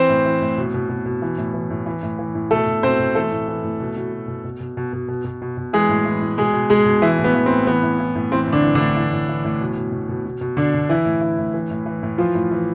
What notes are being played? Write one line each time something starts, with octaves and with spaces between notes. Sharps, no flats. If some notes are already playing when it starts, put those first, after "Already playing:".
Already playing: E3 C4 C5
A2
E3
A2
B2
B2
B2
B2
E3
A2
E3
A2
E3
A2
E3
A2
B2 A3 A4
B2
B2 C4 C5
B2
E3 A3 A4
A2
E3
A2
B2
B2
B2
B2
B2
B2
B2
B2
B2
B2
B2
B2
E3 G#3 G#4
A2
E3
A2
B2 G#3 G#4
B2
B2 G#3 G#4
B2
E3 E4
A2
B3
E3
C4
A2
E3 B3
A2
E3
A2
E3 C4
A2
D3 D4
E3
A2 D3 D4
E3
A2
E3
A2
B2
B2
B2
B2
B2
B2
B2 D3 D4
B2
E3 E4
A2
E3
A2
E3
A2
E3
A2
E3 F3 F4
A2
E3